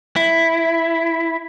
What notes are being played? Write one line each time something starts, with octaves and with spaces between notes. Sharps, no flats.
E4